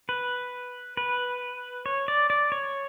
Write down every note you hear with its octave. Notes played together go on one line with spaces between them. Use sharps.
B4
B4
C#5
D5
D5
C#5